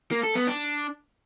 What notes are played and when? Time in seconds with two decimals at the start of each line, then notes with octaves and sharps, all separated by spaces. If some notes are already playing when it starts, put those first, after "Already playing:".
0.11 A#3
0.23 A4
0.35 B3
0.47 D4